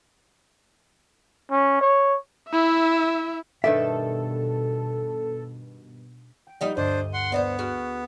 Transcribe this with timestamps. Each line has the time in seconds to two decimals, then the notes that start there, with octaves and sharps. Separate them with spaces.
1.51 C#4
1.81 C#5
2.49 E4 E5
3.64 G2 B2 D#3 A4 D5 E5
6.47 G5 D7
6.61 F3 G3 D#4 F#5
6.77 D2 G2 G3 D4 C5 D#5
7.13 F#5 C6
7.32 B3 C5 D#5 F#5
7.59 F#4 G#4 F6 D7